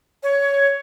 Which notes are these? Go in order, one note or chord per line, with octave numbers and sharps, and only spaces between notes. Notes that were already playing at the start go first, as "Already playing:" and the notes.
C#5